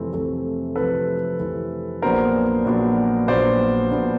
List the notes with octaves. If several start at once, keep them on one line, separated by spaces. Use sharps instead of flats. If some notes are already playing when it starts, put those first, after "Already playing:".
Already playing: F2 C3 E3 A3 C4
F2 C3 E3 A3 C4
F2 C3 E3 A3 C4 A4 B4
F2 C3 E3 A3 C4
A#1 A#2 F#3 B3 D4 A#4 C5
A#1 A#2 F#3 B3 D4
A#1 A#2 F#3 B3 D4 C5 D5
A#1 A#2 F#3 B3 D4